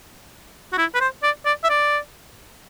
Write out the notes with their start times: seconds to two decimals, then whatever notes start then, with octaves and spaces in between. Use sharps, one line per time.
0.73 F#4
0.78 E4
0.95 B4
1.01 C5
1.23 D5
1.46 D5
1.64 E5
1.70 D5